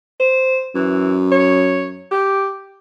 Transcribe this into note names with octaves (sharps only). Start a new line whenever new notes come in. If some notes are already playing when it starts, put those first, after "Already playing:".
C5
F#2 E3
C#5
G4